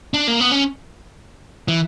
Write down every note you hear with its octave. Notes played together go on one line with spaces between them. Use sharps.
D4
A#3
B3
C#4
E3